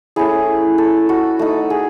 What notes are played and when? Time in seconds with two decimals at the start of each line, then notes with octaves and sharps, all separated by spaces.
0.16 A3 C#4 E4 G#4
0.78 A4
1.09 F#4
1.39 A3 D#4
1.70 G#4